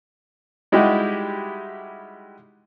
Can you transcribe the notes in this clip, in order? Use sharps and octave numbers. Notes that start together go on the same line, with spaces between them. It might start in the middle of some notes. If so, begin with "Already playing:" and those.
G3 G#3 D#4 E4 F#4 G4